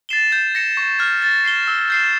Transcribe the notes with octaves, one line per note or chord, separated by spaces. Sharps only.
A6 C7 E7 G7
G6
A#6 C#7 E7
C#6
F6 G#6
A6
C7 E7 G7
E6
G6 C7 E7